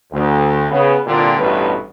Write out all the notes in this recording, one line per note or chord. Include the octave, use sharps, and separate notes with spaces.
D2
C#3 B3
C2 A#2 D3 F4 G4
A1 G2 B2 A3 B4